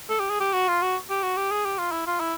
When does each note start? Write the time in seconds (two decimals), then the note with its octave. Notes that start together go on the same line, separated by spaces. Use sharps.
0.09 A4
0.20 G4
0.30 G#4
0.40 G4
0.53 F#4
0.68 F4
0.82 F#4
1.10 G4
1.23 F#4
1.37 G4
1.51 G#4
1.65 G4
1.78 F4
1.92 E4
2.07 F4
2.20 E4